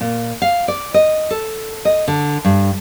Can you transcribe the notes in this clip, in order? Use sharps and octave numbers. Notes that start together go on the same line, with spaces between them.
A#2
F5
D5
D#5
A4
D#5
D3
G2